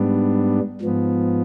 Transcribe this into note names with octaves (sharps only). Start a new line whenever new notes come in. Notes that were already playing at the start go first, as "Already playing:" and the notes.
Already playing: G#2 G3 B3 D4
G#2 F3 B3